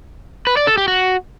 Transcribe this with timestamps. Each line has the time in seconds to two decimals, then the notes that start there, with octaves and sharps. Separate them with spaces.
0.47 B4
0.57 D5
0.67 A4
0.77 G4
0.88 F#4